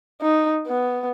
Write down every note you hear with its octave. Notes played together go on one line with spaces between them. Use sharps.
D#4
B3